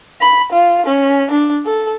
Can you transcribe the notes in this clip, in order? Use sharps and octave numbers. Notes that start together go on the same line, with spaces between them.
B5
F4
C#4
D4
A4